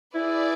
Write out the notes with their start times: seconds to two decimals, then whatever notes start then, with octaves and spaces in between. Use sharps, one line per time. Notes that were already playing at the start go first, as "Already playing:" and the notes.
0.15 E4 G#4 B4 D5